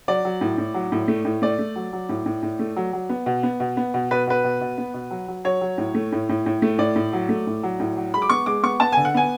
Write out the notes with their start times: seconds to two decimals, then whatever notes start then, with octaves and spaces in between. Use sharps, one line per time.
0.08 F#3 D5
0.25 F#3
0.41 A2
0.58 A2
0.74 F#3
0.92 A2
1.08 A3
1.25 A2
1.42 A3 D5
1.59 A3
1.76 F#3
1.93 F#3
2.09 A2
2.26 A2
2.43 A2
2.59 A3
2.77 F#3
2.93 F#3
3.09 B3
3.26 B2
3.43 B3
3.60 B2
3.77 B3
3.94 B2
4.11 B2 B4
4.27 B2 B4
4.44 B2
4.61 B2
4.78 B3
4.94 B2
5.11 F#3
5.28 F#3
5.44 F#3 C#5
5.61 F#3
5.78 A2
5.95 A3
6.12 A2
6.29 A2
6.46 A2
6.62 A3
6.78 A2 D5
6.96 A2
7.13 F#3
7.29 A3
7.47 A2
7.63 F#3
7.80 A2
7.97 F#3
8.14 G#3 B5
8.22 D6
8.30 B3 C#6
8.46 G#3 D6
8.63 B3 C#6
8.80 B3 A5
8.92 D3 G#5
9.05 F#5
9.14 B3 G#5